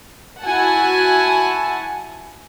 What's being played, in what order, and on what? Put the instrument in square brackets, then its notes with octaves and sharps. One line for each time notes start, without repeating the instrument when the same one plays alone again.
[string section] E4 F#4 F#5 G#5 A5